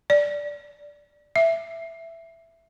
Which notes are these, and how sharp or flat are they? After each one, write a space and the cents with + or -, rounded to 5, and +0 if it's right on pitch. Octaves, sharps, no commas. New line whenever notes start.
D5 -5
E5 +10